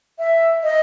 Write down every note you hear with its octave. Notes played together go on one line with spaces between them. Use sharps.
E5
D#5